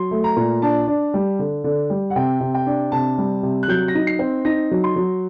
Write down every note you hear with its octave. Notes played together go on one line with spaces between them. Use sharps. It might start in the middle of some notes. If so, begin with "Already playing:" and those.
Already playing: F#3 C6
A3
A#5
A#2
D4 A5
D4
G3
D3
D3
G3
F#5
C3 G5
C3
G5
D4
C3 A5
G3
C3
F#6
F#3 G6
A#6
D#4
C7
C4
D#4 A#6
F#3
C6
F#3